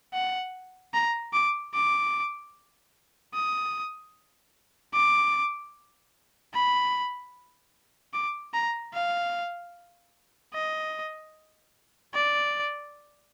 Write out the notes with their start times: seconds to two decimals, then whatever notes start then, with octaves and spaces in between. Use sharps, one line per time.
0.13 F#5
0.94 A#5
1.33 D6
1.74 D6
3.34 D#6
4.93 D6
6.54 B5
8.13 D6
8.54 A#5
8.94 F5
10.54 D#5
12.14 D5